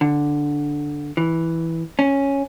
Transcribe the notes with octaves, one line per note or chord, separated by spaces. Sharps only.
D3
E3
C#4